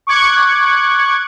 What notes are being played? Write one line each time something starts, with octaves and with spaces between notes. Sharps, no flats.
C#6 D6 F#6 G#6 C#7